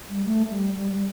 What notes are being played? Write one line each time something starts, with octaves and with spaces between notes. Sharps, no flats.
G3
A3
G3
G3
G3